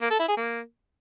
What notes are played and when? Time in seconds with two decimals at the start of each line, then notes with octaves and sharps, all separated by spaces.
0.02 A#3
0.11 A4
0.19 E4
0.28 G#4
0.37 A#3